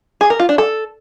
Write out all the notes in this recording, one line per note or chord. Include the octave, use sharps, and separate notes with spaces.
G#4
A#4
F4
D4
A4